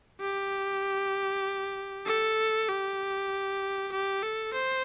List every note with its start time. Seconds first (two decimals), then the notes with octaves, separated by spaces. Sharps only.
0.20 G4
2.06 A4
2.68 G4
3.92 G4
4.23 A4
4.54 C5